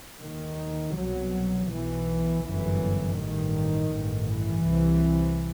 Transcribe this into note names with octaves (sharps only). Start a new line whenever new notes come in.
D#2 D#3
C2 B2 F#3
B1 B2 E3
G1 F#2 E3
A1 G2 D#3
A1 G2
E3
C2 C3